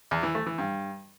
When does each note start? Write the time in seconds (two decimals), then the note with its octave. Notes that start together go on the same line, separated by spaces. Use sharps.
0.11 E2
0.23 E3
0.35 A3
0.46 E3
0.58 G2